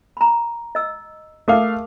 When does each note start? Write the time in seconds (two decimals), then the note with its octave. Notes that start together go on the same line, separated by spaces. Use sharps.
0.17 A#5 B5
0.75 D#5 E6
1.48 A3 G#4 A#4 F5 D6